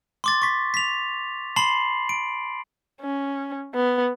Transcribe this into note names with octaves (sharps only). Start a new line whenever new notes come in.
C6 D6 A6
C#6 B6
B6 F7
A5 B5 C6 C7 F#7
D7
C#4
B3